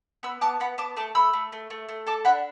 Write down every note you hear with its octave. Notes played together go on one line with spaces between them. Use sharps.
B3 B5 E6
B3 A5 D6
B3 F#5 B5
B3 A5 D6
A3 A5 D6
A3 B5 E6
A3
A3
A3
A3
A4 A5 D6
D4 F#5 B5